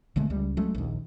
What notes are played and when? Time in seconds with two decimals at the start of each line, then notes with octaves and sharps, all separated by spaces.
0.16 B1 D3 G#3 A3
0.30 C#2 G3
0.57 F#3 G#3 A3 C#4
0.75 A#1 D#2